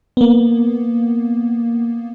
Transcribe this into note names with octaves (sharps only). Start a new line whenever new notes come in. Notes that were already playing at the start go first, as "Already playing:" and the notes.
A#3 B3